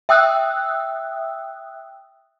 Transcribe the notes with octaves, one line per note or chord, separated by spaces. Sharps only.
E5 G5 D#6 E6 F#6